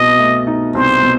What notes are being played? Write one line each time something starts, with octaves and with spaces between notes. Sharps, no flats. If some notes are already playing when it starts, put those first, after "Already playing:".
Already playing: C2 B2 D#5
A3
D#4
C2 C5
B2